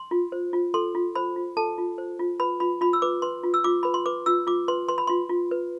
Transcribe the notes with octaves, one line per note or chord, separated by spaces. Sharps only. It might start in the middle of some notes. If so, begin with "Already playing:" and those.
Already playing: C6
F4
C5
F4
A4 C6
F4
C5 B5
F4
A4 A5
F4
C5
F4
B4 B5
F4 B5
F4 B5
E6
B4 D6
B4 C6
F4
E6
F4 D6
B4 B5
C6
B4 D6
F4 E6
F4 D6
B4 C6
B4 C6
B5
F4 C6
F4
B4